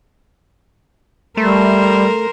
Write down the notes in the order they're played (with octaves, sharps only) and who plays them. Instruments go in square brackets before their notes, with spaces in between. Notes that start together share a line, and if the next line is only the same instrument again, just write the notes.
[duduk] G3 [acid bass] A3 [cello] A#4 C5